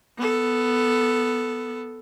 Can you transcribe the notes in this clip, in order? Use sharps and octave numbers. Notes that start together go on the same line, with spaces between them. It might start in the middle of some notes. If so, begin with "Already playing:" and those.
B3 A4